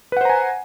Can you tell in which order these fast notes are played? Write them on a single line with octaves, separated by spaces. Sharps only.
B4 F#5 C5 A#5 G#5